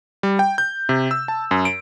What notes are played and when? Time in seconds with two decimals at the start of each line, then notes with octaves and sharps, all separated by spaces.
0.23 G3
0.39 G5
0.58 G6
0.89 C3
1.11 E6
1.28 A5
1.51 F#2
1.65 D7